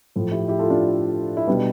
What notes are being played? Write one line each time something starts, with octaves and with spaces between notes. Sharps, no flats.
A2 F3
E4 G4
E4 G4
F4 A4
D4 F4
E4
B2 G3 B3 D4